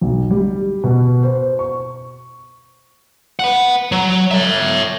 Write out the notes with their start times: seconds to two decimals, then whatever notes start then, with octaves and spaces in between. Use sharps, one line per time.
0.01 B1
0.31 G3
0.84 B2
1.23 C5
1.59 C#6
3.40 B4 F#5
3.92 F#3
4.31 C#5 E5